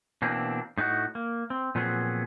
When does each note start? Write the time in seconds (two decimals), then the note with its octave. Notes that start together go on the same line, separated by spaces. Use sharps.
0.22 B2 E3 A#3 C4 D4
0.78 A2 D#4 E4 F#4
1.15 A#3
1.50 C4
1.75 A#2 F3 F#3 B3 C4 G#4